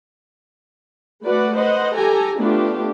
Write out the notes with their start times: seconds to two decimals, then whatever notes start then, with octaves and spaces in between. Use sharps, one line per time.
1.25 A3 F#4 B4 D5 F#5
1.55 B4 C5 D#5 F#5
1.94 G4 A4 G#5 A#5
2.38 A3 B3 D4 F4 G4